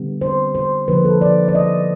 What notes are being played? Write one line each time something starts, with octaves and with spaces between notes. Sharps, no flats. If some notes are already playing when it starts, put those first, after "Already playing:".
Already playing: D3 G3 B3
C5
C5
D3 F3 A#3 B4
A4
D5
D5
D#5